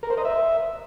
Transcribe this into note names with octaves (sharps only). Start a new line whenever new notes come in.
A#4
C5
D#5
E5